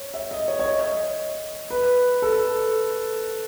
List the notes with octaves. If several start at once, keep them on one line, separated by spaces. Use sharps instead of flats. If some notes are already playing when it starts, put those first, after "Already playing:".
Already playing: C#5
E5
D#5
C#5
C#5
D#5
B4
A4